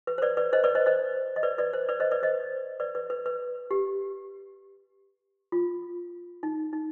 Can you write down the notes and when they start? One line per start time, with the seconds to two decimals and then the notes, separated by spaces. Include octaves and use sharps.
0.07 B4
0.18 C5
0.22 B4 D5
0.37 B4 D5
0.53 C5 D#5
0.64 B4 D5
0.75 C5 D#5
0.86 C5 D#5
1.36 D#5
1.43 B4 D5
1.58 B4 D5
1.73 C5
1.89 B4 D5
2.00 C5 D#5
2.11 B4 D5
2.23 C5 D#5
2.80 B4 D5
2.95 B4 D5
3.10 B4
3.26 B4
3.71 G4
5.52 F4
6.43 D#4
6.73 D#4